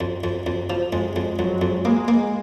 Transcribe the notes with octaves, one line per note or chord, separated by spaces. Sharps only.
F2
F2
F2
F3
F2 G#3
F2
F2 F#3
F2
G#3 A#3
A#3